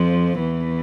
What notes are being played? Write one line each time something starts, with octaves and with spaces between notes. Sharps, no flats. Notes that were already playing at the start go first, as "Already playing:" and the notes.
Already playing: F2 F3
E2 E3